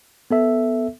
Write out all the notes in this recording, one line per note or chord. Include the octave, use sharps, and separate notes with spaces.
B3 A4 E5